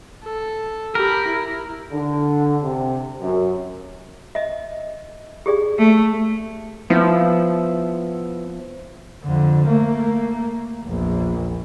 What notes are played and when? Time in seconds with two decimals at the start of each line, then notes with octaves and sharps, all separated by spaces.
0.24 A4
0.95 G4 A#4 B5
1.28 E4
1.91 D3
2.62 C3
3.21 F#2
4.35 D#5 E5
5.46 G4 G#4 D5
5.78 A3
6.90 F3 B3 E4
9.23 F2 D3
9.67 A3 A#3
10.84 A#1 E2